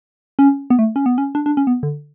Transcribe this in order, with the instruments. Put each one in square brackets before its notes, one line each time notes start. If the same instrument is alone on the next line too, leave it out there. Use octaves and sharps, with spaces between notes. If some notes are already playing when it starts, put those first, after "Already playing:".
[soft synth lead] C#4
B3
A3
C#4
B3
C#4
D4
D4
C#4
B3
D3